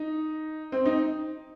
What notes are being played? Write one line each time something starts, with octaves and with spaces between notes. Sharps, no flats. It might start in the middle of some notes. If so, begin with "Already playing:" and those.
Already playing: D#4
C4
D#4